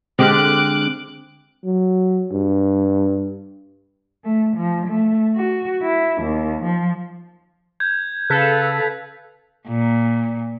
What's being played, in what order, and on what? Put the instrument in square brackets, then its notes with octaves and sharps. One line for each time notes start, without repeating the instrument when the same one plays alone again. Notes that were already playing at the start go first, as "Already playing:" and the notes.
[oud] D3 G#3 G4 [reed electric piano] C4 F6 [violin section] D6 F#6
[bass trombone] F#3
G2
[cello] A3
F3
A3
F#4
E4
D#2
F3
[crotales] G6 G#6
[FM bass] C#3 [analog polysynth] A4 [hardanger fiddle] B4 F5 [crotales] F#6 B6
[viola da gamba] A#2